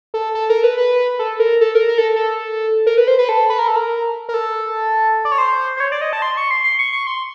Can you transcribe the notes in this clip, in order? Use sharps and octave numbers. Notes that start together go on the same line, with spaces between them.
A4
A4
A#4
B4
B4
A4
A#4
A4
A#4
A#4
A4
A4
A#4
B4
C5
B4
A4
B4
A#4
A4
A#4
A#4
A4
D5
C#5
C5
C5
C#5
D5
D#5
A5
C6
C#6
C6
C6
C#6
C#6
C6